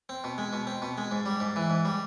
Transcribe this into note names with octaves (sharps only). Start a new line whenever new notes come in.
C4
B2
G#3
B2
C4
B2
G#3
G#2
G3
G#2
E3
G#2
G3